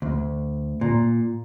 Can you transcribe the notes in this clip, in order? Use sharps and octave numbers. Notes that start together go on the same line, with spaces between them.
D2
A#2